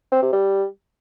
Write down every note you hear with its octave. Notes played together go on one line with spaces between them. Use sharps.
C4
C3
G3